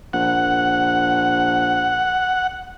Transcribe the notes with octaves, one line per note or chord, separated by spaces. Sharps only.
A#1 F#5